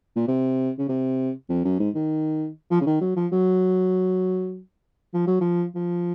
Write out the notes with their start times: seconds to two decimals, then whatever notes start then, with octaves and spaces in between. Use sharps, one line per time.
0.16 A#2
0.28 C3
0.79 C#3
0.89 C3
1.49 F2
1.65 F#2
1.79 G#2
1.95 D#3
2.71 F3
2.81 C#3
2.86 D#3
3.01 F#3
3.17 F3
3.32 F#3
5.14 F3
5.27 F#3
5.41 F3
5.75 F3